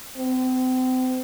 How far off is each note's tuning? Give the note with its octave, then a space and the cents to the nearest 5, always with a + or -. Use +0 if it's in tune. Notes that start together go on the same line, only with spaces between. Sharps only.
C4 -35